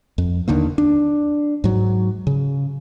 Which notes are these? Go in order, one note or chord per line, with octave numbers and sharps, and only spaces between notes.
F2
D#2 D3 D#3 A#3
D4
G#2 F#3
C#3